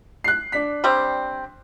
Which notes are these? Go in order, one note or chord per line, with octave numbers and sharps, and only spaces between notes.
F#6 C7
D4 B6
G3 C4